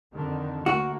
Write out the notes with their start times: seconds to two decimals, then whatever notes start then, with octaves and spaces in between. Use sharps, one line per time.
0.14 F2 D3 D#3
0.66 D2 A#3 F#4